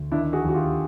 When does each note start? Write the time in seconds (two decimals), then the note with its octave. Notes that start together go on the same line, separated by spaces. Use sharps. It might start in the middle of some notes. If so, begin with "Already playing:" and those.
Already playing: D2
0.11 D#3 D4 E4
0.33 F#4 G#4
0.44 D#2
0.49 F#4
0.54 F4 G4